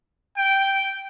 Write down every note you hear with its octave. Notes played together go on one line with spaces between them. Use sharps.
G5